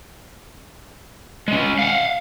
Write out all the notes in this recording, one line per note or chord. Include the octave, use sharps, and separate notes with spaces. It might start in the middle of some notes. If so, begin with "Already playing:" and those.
G#3 C#4
F5 F#5